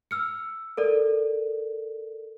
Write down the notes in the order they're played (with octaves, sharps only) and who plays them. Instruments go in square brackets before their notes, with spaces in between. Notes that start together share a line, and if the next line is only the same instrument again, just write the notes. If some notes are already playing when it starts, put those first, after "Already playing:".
[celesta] E6 F6 C#7
A4 A#4 D5